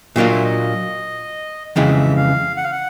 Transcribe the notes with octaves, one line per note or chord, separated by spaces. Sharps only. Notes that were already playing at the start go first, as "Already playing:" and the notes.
A#2 F#3 A#3 D4 F4 D#5
E5
D#5
F2 C#3 E3 G#3 E5
F5
F#5
F5
F#5